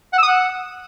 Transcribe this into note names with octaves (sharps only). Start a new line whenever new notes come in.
F#5
E6
D#6
F#5